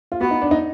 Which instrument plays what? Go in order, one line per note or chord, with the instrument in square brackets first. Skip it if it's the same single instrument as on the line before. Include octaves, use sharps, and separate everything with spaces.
[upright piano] F4
[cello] B3 [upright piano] F#4
[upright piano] D#4
D4
D#4